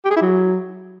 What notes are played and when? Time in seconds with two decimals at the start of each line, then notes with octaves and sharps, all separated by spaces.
0.05 G4
0.11 G#4
0.16 E4
0.22 F#3